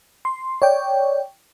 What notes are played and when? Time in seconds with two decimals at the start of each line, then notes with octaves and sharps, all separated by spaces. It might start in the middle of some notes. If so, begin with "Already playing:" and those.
0.25 C6
0.62 C#5 D5 G5